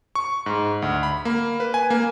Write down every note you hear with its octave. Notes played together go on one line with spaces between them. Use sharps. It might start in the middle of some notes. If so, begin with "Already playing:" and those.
C#6
G#2
D2
B5
A#3
B4
G#5
A#3